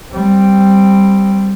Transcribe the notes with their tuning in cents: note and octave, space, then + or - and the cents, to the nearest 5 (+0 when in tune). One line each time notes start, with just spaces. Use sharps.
G3 +0 C4 +0